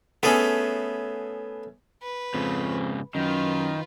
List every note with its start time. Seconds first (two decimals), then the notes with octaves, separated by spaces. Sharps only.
0.23 A3 B3 C#4 G#4 A4
2.03 B4
2.34 F2 G#2 C#3
3.15 F#2 D#3 F4 B4